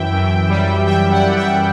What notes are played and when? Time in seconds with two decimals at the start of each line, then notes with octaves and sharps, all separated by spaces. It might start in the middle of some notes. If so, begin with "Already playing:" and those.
Already playing: F#2 E3 E5 G5
0.12 F#2
0.49 G3
0.86 E3 E5 G5
1.11 D5 F#5
1.23 F#2
1.36 E5 G5